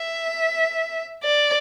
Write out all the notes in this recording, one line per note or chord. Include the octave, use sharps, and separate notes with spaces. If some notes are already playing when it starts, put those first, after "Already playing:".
Already playing: E5
D5